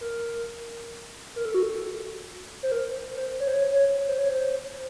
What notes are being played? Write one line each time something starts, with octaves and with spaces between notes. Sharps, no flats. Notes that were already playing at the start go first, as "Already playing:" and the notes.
A#4
A#4
A4
F#4
A4
C5
A#4
C5
C#5
C5
C#5
C#5
C5
C#5
C5